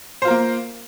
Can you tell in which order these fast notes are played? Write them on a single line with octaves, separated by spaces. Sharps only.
C5 F4 A#4 A#3